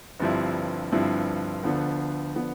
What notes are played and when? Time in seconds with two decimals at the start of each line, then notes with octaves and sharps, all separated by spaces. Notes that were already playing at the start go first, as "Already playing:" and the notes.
0.19 G1 G2 F3 C4 E4
0.92 G1 G2 F3 C4 E4
1.63 D2 D3 F3 B3
2.36 D3 F3 B3